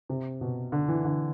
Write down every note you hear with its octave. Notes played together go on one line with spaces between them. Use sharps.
C3
B2
D3
E3
D3